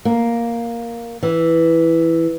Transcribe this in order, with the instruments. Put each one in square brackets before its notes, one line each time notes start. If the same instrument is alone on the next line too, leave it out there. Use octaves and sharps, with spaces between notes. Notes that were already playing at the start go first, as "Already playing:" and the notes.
[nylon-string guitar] A#3
E3